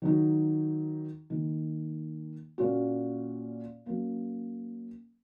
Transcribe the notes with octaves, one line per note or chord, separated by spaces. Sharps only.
D#3 F#3 D#4 F#4
D#3 A#3 D#4
A#2 A#3 C#4 F#4
F#3 A#3 C#4